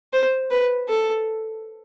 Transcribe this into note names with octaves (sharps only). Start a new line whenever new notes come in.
C5
B4
A4